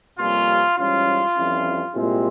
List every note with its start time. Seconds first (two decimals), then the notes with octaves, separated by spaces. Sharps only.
0.19 F2 C3 G3 A#3 C#4 F4
0.77 G#2 E3 G3 C#4 F4
1.35 F2 E3 G3 C#4 E4
1.93 C2 A#2 G#3 C4 E4 G4